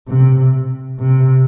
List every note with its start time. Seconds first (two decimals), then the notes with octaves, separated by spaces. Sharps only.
0.08 C3
0.99 C3